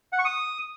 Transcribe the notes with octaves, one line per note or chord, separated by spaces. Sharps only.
F#5
C#6
D#6